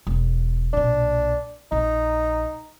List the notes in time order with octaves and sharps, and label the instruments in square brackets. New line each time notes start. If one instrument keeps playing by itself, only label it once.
[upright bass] E1
[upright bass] B1 A#2 [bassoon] D4
[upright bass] A#1 [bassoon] D#4